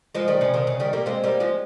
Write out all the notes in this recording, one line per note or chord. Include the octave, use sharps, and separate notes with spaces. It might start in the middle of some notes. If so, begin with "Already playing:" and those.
F3 G#3
D#3 G3
C#3 F3
C3 D#3
C#3
D#3 G3
G3 A#3
G#3 C4
G3 A#3
F3 G#3